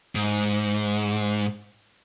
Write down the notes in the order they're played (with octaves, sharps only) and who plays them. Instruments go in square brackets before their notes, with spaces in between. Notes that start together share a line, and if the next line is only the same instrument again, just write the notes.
[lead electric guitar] G#2